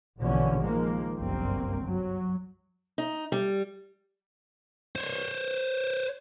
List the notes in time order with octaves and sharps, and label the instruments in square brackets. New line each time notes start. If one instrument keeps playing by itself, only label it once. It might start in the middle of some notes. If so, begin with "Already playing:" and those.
[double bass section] A#1 B2 D3 E3 C#4
D#3 F3 G#3 A#3
G1 C2 F#2 A#3 C4
F#3
[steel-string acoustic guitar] D#4
G3
[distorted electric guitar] C5 C#5